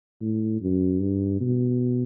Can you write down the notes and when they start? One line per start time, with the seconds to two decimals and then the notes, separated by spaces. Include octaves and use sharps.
0.21 A2
0.62 F#2
1.00 G2
1.41 B2